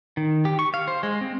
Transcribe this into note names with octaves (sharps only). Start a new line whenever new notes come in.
D#3
G4
C#6
F5
C5
G#3
C4